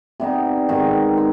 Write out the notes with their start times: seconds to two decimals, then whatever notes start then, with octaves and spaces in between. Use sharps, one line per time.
0.20 C3 G3 B3 D#4
0.68 G#2 D#3 B3 D#4
1.17 C4